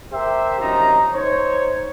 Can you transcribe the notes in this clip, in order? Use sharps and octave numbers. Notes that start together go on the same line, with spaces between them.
G4 A#4 C5 E5
F#2 C3 F3 D#4 A#5
D#4 C5 C#5